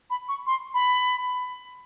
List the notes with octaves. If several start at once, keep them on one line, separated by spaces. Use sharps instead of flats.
B5
C#6
C6
B5